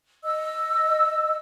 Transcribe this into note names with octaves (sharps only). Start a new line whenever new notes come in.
D#5 E6